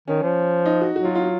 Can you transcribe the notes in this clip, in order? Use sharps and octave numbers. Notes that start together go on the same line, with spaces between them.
D#3 C#4
F3
D#4
F#4
F#3 F#4
F4
F4